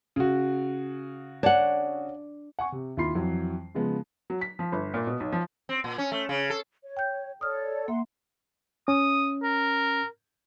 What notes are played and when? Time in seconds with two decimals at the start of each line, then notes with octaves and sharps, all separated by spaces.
0.16 C#3 F#4
1.43 D4 C#5 F#5
2.59 F#5 G#5 C#6
2.72 C3
2.97 D#2 E4 F4 B5 C6 C7
3.15 F2 E3 F#3
3.75 C#3 F3 G#3 B3
4.30 F#3
4.41 B6
4.59 F3
4.72 G1
4.94 A#2
5.07 B2
5.20 B1
5.32 F3
5.69 C4
5.84 A#2
5.98 C#4
6.12 A3
6.29 C#3
6.50 A4
6.83 C#5
6.97 G5 G6
7.41 A4 C#5 D5 D#6 F6
7.88 A#3 E5 F#5 C6
8.88 C#4 D#6
9.43 A#4